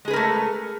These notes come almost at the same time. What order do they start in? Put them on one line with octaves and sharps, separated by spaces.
G#3 G#4 B4 A#4 A3